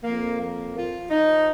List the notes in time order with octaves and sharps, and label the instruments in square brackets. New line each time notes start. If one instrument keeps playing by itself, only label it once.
[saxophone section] F2 A#3
F3 A#3
F3 F4
F3 D#4